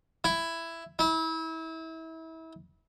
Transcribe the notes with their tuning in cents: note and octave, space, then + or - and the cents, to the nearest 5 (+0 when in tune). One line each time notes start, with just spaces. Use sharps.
E4 +10
E4 -30